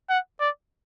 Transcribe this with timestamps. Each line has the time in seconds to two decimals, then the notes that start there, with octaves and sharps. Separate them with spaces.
0.10 F#5
0.40 D5